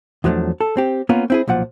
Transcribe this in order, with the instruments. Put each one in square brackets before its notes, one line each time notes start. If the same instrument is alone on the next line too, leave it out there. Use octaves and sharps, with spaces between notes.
[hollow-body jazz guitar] E2 F3 F#3 G#3 A3 D4
A4
C4 G4
A#3 B3 C#4 F4 A#4
C4 E4 G#4
B1 A#2 F3 F#5